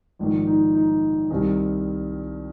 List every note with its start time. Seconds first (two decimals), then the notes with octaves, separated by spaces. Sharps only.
0.19 A#1 G#2 D#3
0.47 D#4
0.75 D#4
1.31 C2 C3 D#3